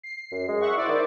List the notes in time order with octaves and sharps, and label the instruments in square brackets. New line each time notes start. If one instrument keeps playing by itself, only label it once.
[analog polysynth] C7
[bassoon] F#2
G#3
[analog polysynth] E5 F#5 C#6
[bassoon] E4 [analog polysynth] C5 D5
[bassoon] D#3